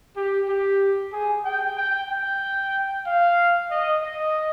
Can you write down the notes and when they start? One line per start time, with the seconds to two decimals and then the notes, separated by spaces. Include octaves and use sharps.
0.17 G4
0.49 G4
1.13 G#4
1.45 G5
1.78 G5
2.10 G5
3.06 F5
3.71 D#5
4.03 D#5